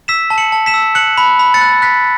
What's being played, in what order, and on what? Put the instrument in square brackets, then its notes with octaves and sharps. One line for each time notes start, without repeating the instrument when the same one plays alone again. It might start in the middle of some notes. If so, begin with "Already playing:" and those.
[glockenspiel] E6 B6 E7
A5
C#7 F#7
A5
B6 E7
E6
F#6 C#7 F#7
B5
B5
A6 C#7
F#6
F#6 B6